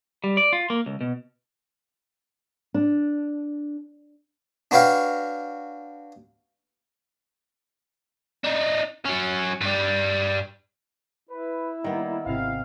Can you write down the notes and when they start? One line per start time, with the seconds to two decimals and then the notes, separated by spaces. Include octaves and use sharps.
0.24 G3
0.37 D5
0.53 F4
0.70 A#3
0.86 C#2
1.01 B2
2.74 D4
4.71 D4 F#4 B4 C#5 F5 G5
8.44 D4 D#4
9.05 F#3 C#4
9.61 G2 G3
11.29 E4 B4
11.84 D#3 G3 A#3 B3
12.26 G#1 C3 C4 F5